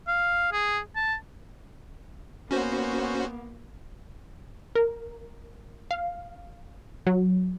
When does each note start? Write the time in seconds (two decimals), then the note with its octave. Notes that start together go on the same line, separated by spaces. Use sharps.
0.07 F5
0.52 G#4
0.96 A5
2.51 A#3 B3 C#4 F#4 C5
4.75 A#4
5.91 F5
7.07 F#3